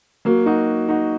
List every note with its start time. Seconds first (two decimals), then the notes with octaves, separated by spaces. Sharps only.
0.25 F#3 A#3
0.46 D#4 F#4
0.88 D#4 F#4